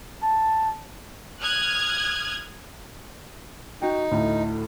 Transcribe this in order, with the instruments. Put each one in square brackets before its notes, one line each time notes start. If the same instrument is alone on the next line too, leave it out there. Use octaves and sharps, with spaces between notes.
[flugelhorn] A5
[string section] D#6 F6 F#6 G#6
[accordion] D#4 [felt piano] F#4 G5
[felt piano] D2 A2